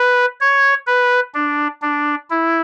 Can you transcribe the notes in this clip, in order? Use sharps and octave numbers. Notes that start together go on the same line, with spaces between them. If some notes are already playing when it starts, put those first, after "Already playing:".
Already playing: B4
C#5
B4
D4
D4
E4